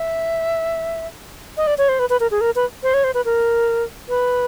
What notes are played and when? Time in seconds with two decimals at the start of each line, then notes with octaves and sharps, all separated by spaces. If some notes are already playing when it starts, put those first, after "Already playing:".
Already playing: E5
1.57 D#5
1.67 D5
1.78 C#5
1.89 C5
1.99 B4
2.10 B4
2.20 A#4
2.31 G#4
2.41 A#4
2.56 B4
2.83 C5
2.94 C#5
3.04 C5
3.14 B4
3.25 A#4
4.09 B4